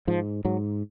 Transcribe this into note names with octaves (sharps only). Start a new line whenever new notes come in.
G#2 F3
G#2 F#3